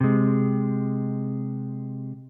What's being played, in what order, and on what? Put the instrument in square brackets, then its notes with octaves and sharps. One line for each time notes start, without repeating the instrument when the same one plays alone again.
[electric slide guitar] C3 G#3